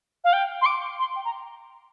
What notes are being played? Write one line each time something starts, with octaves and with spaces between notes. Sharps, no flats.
F5
G5
C6
D6
C6
G5
A#5